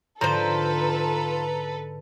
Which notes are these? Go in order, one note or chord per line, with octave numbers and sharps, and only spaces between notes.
G#2 D3 F3 A4 B4 C5 A#5